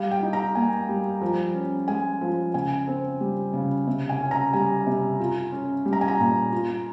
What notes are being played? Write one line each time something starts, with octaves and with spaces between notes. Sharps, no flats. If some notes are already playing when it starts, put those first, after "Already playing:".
Already playing: G3 F5
G5
D#4
A#5
A#3 G#5
G3
F3
C#4
G#3 G#5
F3
C#3 G#5
C4
G3
C#3
C3
G#5
C#4
A#5
G3 G#5
C3
F4
C#4
G3
A#5
G#5
A#5
A#2
F4